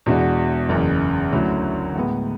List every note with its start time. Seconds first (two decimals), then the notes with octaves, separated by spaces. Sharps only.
0.06 E2 B2 G#3 D4 F#4
0.69 F#1 E2 C#3
1.32 D2 D3 F#3 C#4 E4
1.95 A2 G#3 B3